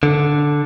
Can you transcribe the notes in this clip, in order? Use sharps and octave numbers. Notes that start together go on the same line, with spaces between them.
D3